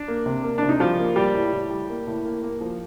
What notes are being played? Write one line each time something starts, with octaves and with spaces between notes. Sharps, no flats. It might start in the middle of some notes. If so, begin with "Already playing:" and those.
Already playing: D4
A#3
C3
A#3
C3 D4
D#4
F3 G3 F4
A#3
G3 G4
A2
A2
G3
A#3
A2
A#3
A#3
F3